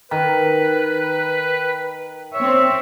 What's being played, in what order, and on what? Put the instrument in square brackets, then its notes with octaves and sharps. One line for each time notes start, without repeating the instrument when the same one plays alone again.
[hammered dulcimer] D#3 [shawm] B4
[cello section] C4 C#5 [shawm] E5